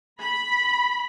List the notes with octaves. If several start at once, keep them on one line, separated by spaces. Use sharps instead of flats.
B5